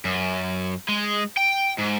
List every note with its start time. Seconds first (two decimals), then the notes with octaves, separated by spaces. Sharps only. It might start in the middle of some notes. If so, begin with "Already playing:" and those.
0.05 F#2
0.89 G#3
1.37 G5
1.79 G#2